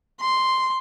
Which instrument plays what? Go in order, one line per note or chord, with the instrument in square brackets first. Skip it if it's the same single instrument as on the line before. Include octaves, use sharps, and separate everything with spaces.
[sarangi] C6